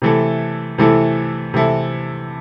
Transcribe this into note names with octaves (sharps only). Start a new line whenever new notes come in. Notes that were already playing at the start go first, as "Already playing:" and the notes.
C3 E3 A3 E4 A4
C3 E3 A3 E4 A4
C3 E3 A3 E4 A4